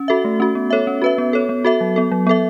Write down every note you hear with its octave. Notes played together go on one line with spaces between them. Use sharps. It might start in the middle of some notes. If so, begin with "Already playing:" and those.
Already playing: C#4
F#4 A4 E5
A3
C#4 F#4
B3
A4 C#5 E5
C#4
F#4 B4 E5
B3
A4 C#5
B3
F#4 A4 E5
F#3
B3 A4
F#3
B3 A4 E5